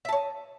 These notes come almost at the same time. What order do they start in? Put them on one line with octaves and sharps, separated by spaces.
E5 A5 C#5 D#5